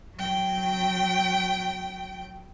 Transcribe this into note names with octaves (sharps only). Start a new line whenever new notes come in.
F#3 G5